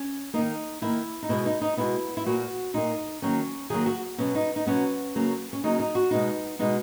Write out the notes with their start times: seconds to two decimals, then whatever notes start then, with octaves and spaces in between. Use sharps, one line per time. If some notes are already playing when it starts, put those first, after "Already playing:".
Already playing: C#4
0.34 D#3 A#3 D#4
0.81 D#3 A#3 E4
1.23 D#4
1.29 B2 G#3 B3 E4
1.46 D#4
1.61 D#4
1.77 B2 G#3 B3 E4
2.17 E4
2.26 A#2 A#3 F#4
2.74 A#2 A#3 D#4
3.22 D#3 F#3 A#3 C#4
3.70 D#3 F#3 A#3 G#4
3.86 F#4
4.18 B2 F#3 B3 C#4
4.35 D#4
4.56 D#4
4.66 B2 F#3 B3 C#4
5.15 C#3 F#3 A#3
5.53 C#4
5.63 C#3 F#3 A#3 D#4
5.79 D#4
5.95 F#4
6.11 B2 G#3 B3 D#4
6.59 B2 G#3 B3 D#4